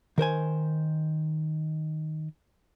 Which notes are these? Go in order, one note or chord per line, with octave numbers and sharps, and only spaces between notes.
D#3 A#4 C5 G#5